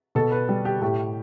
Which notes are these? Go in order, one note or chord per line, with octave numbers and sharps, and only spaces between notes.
B2 A4
B4
G3
G4
A2 G4